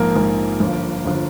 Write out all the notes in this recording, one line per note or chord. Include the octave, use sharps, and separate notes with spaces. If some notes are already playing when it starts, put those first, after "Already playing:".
Already playing: A#1 G#2 F3 A#3 A#4
A#1 G#2 F3
G1 G2 D3 F3
G1 D3 F3